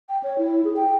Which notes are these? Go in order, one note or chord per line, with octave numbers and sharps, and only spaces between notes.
G5
C#5
E4
G#4
G5